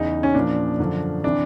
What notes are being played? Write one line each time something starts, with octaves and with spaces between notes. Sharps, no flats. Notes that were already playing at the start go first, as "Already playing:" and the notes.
Already playing: E2 C#3 E3 D#4
C#4
A#2 F3 D4
F#2 D3 F3
C3 E3 D4